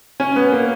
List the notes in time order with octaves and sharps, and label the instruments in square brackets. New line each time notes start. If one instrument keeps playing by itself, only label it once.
[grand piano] C#4
B3
A#3